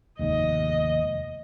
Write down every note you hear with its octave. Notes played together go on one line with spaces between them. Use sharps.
F1 D#2 G#2 D#5